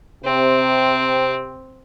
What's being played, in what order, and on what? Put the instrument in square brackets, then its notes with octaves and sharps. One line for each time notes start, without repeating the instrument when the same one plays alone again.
[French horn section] C3 [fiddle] C4